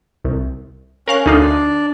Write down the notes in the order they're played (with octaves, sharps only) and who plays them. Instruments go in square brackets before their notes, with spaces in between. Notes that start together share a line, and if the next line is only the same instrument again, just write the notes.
[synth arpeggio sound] C2
[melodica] C#4 [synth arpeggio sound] A#4 F5 F#6
[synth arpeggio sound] D2 D#4 F4 [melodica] D4